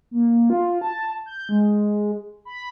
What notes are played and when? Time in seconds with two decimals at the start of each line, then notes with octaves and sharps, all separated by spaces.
0.11 A#3
0.50 F4
0.81 A5
1.26 G6
1.49 G#3
2.45 B5